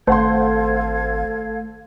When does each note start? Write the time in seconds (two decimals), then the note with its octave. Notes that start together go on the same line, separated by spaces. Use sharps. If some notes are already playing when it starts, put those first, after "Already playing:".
0.07 G#1 A3 A4 C5 F5 F#5 C6 G#6